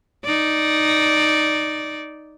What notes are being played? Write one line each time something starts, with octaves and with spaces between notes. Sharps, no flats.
D#4 D5